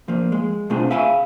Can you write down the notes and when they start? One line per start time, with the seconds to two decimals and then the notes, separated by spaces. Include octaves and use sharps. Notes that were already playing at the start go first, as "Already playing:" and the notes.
0.08 F3 A#3
0.32 G#3
0.70 B2 A3 C4 D4 F4 G#4
0.90 G#4 E5 F5 G#5 B5